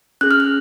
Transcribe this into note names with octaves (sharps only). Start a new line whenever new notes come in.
C#4 G#4 F#6
F6
F#6